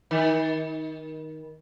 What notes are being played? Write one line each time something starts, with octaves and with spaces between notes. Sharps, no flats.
D#3